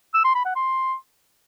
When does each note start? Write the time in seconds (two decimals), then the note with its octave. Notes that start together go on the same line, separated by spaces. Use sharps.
0.14 E6
0.24 C6
0.35 B5
0.45 F#5
0.56 C6